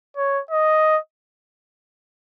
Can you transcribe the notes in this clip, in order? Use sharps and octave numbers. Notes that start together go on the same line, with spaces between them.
C#5
D#5